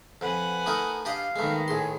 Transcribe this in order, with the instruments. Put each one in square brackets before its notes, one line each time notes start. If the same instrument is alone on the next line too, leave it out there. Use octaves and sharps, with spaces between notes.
[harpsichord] F2 [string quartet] B4 F#5 G#5
[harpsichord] A3 D#4 A#4 [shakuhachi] D#6
[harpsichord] D4 G4 D#5 [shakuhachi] F5
[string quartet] D#3 B3 [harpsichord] G#3 A3
[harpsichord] A2 C6 [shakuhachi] G#4